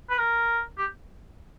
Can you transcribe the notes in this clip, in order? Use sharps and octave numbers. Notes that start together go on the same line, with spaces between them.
B4
A#4
G4